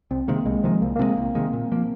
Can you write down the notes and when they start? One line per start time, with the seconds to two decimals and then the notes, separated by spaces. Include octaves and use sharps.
0.11 C2 C4
0.28 C3 D#3 G#3 A#3
0.46 C2 G#3
0.63 C3 D#3 F3 G#3
0.82 C2 A#3
0.96 A#3
0.99 C3 D#3 G#3 C4
1.18 C2
1.35 C3 D#3 G#3
1.53 A#2
1.72 F3 A#3